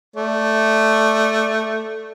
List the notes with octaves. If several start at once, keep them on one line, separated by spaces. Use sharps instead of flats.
A3 D5